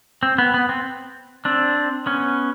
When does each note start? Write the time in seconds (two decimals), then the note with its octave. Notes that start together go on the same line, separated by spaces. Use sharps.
0.23 C4
0.38 B3
0.54 B3
0.69 C4
1.45 C4 D4
2.06 B3 C#4